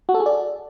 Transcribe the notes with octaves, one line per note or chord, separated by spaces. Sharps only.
F#4
A4
G#4
D5